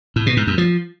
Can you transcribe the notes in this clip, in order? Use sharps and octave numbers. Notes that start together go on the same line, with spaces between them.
A2
B2
G#2
F#2
F3